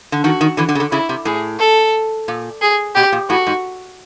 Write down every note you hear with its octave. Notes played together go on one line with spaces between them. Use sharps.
D3
D#3 F#4
D#3
D3 E3
D3
C#3
D3
C#3 E4
C3
A2 G#4
A4
A#2
G#4
B2 G4
A#2
A2 F#4
G#2